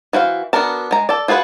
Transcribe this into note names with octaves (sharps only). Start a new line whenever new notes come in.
E3 F#4 C5 F5
B3 D4 F#4 A#4 A5
G#3 A#5
A4 D5
F4 F#4 G#4 B4 F#5